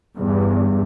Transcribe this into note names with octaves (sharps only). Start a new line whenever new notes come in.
E2 G2